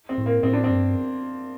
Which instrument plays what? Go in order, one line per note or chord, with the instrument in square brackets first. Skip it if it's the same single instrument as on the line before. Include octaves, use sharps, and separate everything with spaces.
[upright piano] C4
[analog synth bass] A2
[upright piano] A#3
[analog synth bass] A2 [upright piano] C4
[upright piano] D4
C4
[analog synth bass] G2